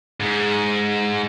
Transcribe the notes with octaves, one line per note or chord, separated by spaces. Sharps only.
G#2